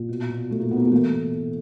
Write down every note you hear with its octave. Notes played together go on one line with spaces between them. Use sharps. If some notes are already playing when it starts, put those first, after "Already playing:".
Already playing: A#2
B2
B2
B2 A3
A#3
B2 B3
A#3
B3
A#3
E3 A3
A2
A2